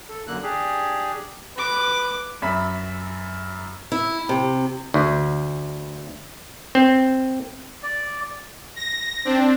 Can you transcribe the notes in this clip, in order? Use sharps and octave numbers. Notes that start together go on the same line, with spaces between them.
A4
F#2 D3 A#3 F#6
D4 G4 G#4
B4 D6
F#2 E5 B5
E4
C3
D2
C4
D5
A#6
C4 D4